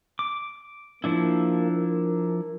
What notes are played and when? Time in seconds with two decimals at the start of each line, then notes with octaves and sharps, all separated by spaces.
0.19 D6
1.04 F3 A#3 D4 E4
1.71 A#4